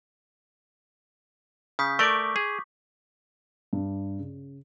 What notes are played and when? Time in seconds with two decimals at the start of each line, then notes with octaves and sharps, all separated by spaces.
1.79 C#3 D#6 G6 B6
1.99 A3 A#4 D5 C#6 D6
2.36 G#4
3.73 G2
4.18 C#3